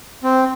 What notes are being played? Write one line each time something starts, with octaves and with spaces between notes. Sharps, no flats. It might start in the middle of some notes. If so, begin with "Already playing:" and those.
C4